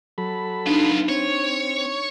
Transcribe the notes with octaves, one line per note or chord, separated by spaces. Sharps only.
F#3 A4 B5
B3 D4 D#4 F4
C4 C#5